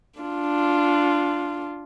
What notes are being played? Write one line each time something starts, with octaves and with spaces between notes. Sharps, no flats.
D4 F4